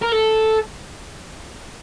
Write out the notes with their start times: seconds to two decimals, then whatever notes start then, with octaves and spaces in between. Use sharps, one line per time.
0.02 A#4
0.12 A4